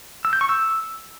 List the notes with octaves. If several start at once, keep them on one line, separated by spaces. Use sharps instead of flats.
E6
G6
C#6
E6